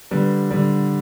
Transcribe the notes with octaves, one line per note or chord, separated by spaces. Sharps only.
D3 G3 B4
D3 G3